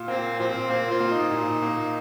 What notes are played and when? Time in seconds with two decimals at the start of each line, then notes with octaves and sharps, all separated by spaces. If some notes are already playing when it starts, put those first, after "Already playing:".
Already playing: A#2 F4
0.08 A#3 C4
0.40 A#2 F3 C4
0.70 A#3 C4
0.91 F4
1.01 A#3
1.11 D#4
1.31 A#2
1.62 A#3